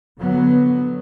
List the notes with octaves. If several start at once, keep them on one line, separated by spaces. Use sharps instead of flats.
D3 F#3 B3